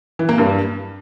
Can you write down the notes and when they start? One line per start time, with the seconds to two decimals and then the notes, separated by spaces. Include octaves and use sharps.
0.19 E3
0.29 A#3
0.38 G2